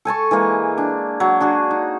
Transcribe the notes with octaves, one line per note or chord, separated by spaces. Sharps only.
A4 G#5 A5 C#6
E3 G#3 A#3 C#6
D4
F#3
D4 F#4 G#4
D#4